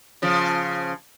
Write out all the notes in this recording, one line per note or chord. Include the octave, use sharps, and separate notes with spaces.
C#3 F3